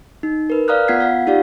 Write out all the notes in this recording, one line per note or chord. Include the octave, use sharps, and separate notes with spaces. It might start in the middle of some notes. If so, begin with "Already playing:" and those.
D#4
A#4 B4
D5 F5 A#5 D#6 F6 F#6
B3 F4 F#5 G#6 B6 C7
F5 F#5
D#4 F4 G4 D5 F5